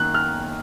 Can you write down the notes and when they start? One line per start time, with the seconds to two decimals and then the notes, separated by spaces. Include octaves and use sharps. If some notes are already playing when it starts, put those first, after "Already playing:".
Already playing: F#2 D#3 A#3 F#6
0.14 F6